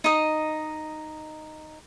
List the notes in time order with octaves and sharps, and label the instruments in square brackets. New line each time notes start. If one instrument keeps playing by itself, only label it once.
[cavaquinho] D#4 D#5